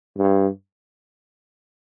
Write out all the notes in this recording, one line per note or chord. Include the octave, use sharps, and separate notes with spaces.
G2